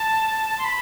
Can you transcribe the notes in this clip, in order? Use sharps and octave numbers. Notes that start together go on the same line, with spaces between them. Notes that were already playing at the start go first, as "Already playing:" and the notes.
Already playing: A5
C6
B5